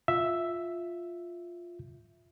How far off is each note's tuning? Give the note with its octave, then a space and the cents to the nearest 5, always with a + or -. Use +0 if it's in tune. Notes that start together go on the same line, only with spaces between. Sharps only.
F4 +0 E5 +0